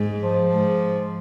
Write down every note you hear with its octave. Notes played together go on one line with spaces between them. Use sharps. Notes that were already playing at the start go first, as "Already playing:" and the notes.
Already playing: G#2
F3
G#2